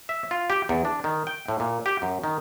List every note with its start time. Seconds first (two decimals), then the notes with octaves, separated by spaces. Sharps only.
0.09 E5
0.31 F4
0.50 G4
0.69 E2
0.85 D4
1.04 D#3
1.27 G5
1.48 A2
1.60 A#2
1.86 G4
2.02 F#2
2.24 D#3